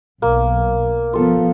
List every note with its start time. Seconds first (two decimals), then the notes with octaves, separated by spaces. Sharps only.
0.22 B1 A#3
1.13 F3 B3 F4 A4